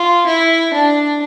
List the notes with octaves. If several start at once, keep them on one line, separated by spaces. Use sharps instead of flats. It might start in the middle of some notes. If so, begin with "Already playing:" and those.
Already playing: F4
E4
D4